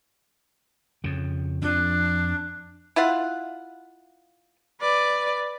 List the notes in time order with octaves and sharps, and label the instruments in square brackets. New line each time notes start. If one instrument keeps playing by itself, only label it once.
[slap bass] F2 C#3
[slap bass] F2 F3 [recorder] D4
[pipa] E4 F4 F5 F#5
[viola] B4 D5